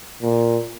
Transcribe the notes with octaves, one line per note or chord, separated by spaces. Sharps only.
A#2